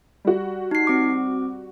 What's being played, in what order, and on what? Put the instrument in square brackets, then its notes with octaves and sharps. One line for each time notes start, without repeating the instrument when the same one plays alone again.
[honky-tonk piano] G3 F#4
[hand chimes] D#4 C7
C4 D6